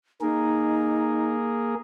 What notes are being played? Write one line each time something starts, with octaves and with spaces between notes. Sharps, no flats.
A#3 D#4 G#4 A#4